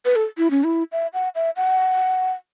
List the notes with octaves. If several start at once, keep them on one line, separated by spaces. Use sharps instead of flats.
B4
A4
E4
C#4
E4
E5
F#5
E5
F#5